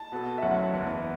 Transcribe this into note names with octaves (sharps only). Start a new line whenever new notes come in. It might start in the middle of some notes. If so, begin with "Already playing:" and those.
Already playing: A5
B2 B3 F#4 A4
E5
F#1 F#2 F#3 A3 C#4 F#5
F#1 E2 E3 B3